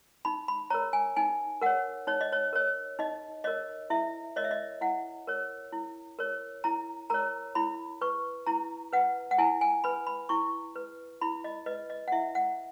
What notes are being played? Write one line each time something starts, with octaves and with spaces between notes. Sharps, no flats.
D#4 B5
B5
A#4 C#5 A#5
G#5
D#4 G#5
A#4 C#5 F#5
D#4 C#5
D#5
C#5
A#4 C#5
D#4 D#5
A#4 C#5 D#5
E4 E5
A#4 C#5 D#5
E5
D#5
E4 F#5
A#4 C#5
E4
A#4 C#5
E4 A#5
A#4 C#5 A#5
E4 B5
B4 C#6
E4 A#5
B4 F#5
F#5
E4 G#5
G#5
B4 B5
B5
E4 C#6
B4
E4 B5
D#5
B4 D#5
D#5
F#5
E4 E5
F#5